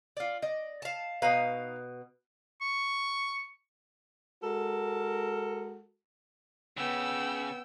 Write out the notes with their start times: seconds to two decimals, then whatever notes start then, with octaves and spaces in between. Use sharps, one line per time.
0.17 F4 D5
0.42 D5 D#5
0.82 F5 A5
1.22 B2 D#4 B4 F5 A#5
2.61 C#6
4.42 G#3 F#4 A4 A#4
6.77 C#3 B3 G5 E6